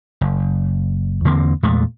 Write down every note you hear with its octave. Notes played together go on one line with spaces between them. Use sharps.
F#1
E2 D3 A#3 C4
E2 A#2 G#3 A3